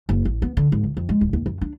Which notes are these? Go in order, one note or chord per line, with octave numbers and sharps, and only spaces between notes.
F#1
A1
B3
D3
G#1
C#2
F2
G#3
D1
D#2
F#2
D4